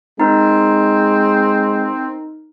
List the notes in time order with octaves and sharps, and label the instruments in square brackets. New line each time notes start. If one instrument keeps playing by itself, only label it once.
[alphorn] G#3 [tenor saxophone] C4 [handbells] D#4 A#4